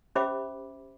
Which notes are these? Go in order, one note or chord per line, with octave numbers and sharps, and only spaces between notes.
C#4 G4 C5 E5 B5 D6